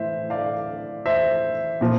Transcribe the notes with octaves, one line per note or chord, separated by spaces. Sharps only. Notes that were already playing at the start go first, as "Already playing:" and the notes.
Already playing: A2 E3 C5 E5
D5 F5
C5 E5
A#2 F3